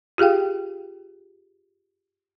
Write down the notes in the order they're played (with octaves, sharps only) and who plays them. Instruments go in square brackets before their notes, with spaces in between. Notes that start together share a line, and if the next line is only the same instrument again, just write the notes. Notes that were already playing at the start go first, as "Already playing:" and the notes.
[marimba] F4 G4 G#4 F5 G5